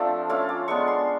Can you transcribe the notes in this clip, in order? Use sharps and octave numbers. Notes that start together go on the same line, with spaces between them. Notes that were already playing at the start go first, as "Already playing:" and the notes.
Already playing: F3 A3 C4 D4 F4
A3 C#4 F4 D6
D6
G#3 B3 D4 C#6
C6